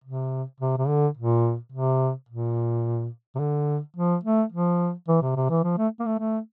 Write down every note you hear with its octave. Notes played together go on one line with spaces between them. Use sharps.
C3
C3
C3
D3
A#2
C3
A#2
C3
D3
F3
A3
F3
E3
C3
C3
E3
F3
A3
A#3
A3
A3